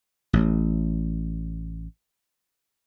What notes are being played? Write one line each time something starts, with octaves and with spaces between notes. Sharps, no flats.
A1 A2